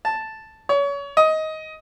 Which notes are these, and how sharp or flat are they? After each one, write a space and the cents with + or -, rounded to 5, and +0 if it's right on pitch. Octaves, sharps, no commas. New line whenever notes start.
A5 +0
C#5 +30
D#5 +15